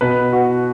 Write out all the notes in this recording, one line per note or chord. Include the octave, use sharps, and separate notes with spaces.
B2 B4
F#4